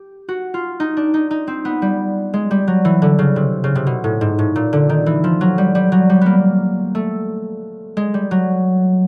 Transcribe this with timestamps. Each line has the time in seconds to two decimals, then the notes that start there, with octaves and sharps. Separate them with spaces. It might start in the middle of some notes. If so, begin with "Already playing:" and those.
Already playing: G4
0.29 F#4
0.54 F4
0.80 D#4
0.97 D4
1.14 D#4
1.31 D#4
1.47 C4
1.65 B3
1.82 G3
2.34 G#3
2.51 G3
2.67 F#3
2.85 E3
3.02 D3
3.19 C#3
3.36 C3
3.64 C#3
3.75 C3
3.87 B2
4.04 A2
4.21 G#2
4.39 A2
4.56 A#2
4.73 D3
4.89 D#3
5.06 E3
5.24 F3
5.41 F#3
5.58 G3
5.75 G3
5.92 F#3
6.10 G3
6.21 A#3 B3
6.95 A3
7.97 G#3
8.14 G3
8.31 F#3